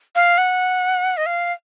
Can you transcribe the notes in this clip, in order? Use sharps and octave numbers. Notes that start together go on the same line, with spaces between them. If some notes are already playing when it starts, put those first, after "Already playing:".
F5
F#5
D#5
F5